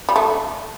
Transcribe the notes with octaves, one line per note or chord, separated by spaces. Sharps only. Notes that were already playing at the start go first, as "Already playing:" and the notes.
G3
A3